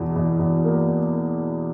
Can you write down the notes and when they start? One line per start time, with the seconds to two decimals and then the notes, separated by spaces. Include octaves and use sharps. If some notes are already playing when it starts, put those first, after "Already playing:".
Already playing: E2 B2
0.16 E2
0.40 E2
0.64 A#3